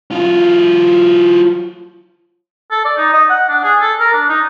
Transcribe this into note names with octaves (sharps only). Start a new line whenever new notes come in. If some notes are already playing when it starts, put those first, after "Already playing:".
F#3 F4
A4
D5
D#4
D#5
F#5
D4
G#4
A4
A#4
D4
D#4